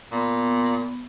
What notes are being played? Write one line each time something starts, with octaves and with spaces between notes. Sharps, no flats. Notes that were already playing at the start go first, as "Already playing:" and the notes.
A#2 B3